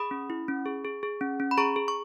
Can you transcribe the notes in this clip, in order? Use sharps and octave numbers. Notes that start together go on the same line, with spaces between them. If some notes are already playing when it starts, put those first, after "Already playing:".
Already playing: G#4 B5 D#6
C#4
E4
C#4
G#4
G#4
G#4
C#4
C#4
B5
G#4 A#5 C#6
G#4
C#6